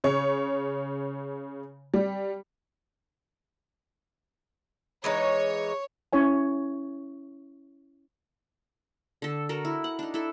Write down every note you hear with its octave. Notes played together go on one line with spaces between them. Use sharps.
C#3 C#5
G3
E3 G#3 D#4 C#5
C#4 E4 C#5 G#5
D3 A4
F#4 A4 A#4
E4
F#5
D4 D#4
E4 A4